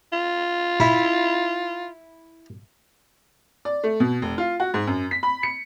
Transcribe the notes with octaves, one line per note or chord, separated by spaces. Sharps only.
F4
E4
D5
A3
B2
F1
F4
F#4
G#2
F#2
B6
B5
C#7